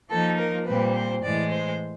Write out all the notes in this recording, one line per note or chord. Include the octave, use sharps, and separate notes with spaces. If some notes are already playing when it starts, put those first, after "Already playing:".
F3 A#3 D#4 A4
A#4
A#2 G3 C4 B4
C5
A2 E3 G#3 D5
C5